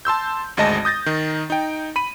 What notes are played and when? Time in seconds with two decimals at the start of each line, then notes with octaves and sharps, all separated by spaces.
0.05 A5 C6 E6 G6
0.57 G#1 D2 G#3 D#5 A5 A#6
0.85 D#6 G6 A6 A#6
1.06 D#3 D#4
1.50 D#4 G5
1.96 B5 D#7